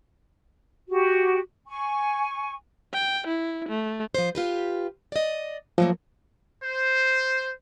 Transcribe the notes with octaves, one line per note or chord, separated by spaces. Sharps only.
F#4 G4
G#5 C#6
G5
E4
A3
F3 C5
F4 G4 B4
D5 D#5
F3 F#3 A3 A#3
C5